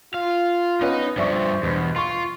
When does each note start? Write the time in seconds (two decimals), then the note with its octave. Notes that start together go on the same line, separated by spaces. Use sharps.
0.14 F4 F5
0.81 B3 C#4 D#4 B4 D#5
1.17 G2 F3 C5 D5 E5 C#6
1.63 E2 G2 B2
1.96 F4 C6 C#6